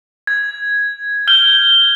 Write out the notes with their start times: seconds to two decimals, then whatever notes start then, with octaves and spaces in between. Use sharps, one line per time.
0.27 G#6
1.27 F6 G6 G7